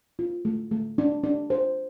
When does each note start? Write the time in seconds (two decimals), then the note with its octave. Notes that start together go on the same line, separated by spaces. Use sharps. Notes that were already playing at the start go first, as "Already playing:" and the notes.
0.19 F4
0.45 A3
0.71 A3
0.98 D4
1.24 D4
1.50 C5